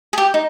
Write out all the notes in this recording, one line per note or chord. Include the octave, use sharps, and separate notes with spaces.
G#4
G4
D#4